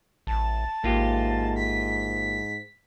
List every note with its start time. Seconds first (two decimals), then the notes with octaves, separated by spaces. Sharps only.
0.27 A1 A5
0.84 A1 G#2 A#3 F4 G4
1.56 B6